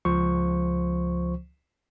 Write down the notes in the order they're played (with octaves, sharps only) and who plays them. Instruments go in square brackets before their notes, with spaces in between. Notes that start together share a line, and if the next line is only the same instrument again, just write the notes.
[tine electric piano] C#2 F3 C5 C#6